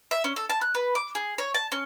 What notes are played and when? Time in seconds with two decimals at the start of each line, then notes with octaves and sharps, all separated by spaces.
0.11 E5
0.24 C#4
0.36 A4
0.49 A5
0.61 F#6
0.75 B4
0.95 D6
1.15 G#4
1.38 C#5
1.54 A5
1.72 C#4